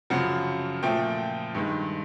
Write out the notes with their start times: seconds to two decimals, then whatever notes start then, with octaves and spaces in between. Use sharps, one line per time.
0.10 F#2 C#3 F3 F#5
0.83 A#2 F3 A3 G5
1.55 G2 D#3 G#3